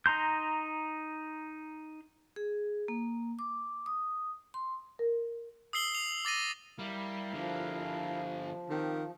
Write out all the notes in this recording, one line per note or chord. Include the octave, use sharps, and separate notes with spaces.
D#4 A#5 C6 G6
G#4
A#3
D6
D#6
C6
A#4
D#6 E6 C7 F#7 G7
C7 F7
D6 A6 A#6 D#7
G3 E4 A#4 F5
D3 F3 G3
D#3 C4 G4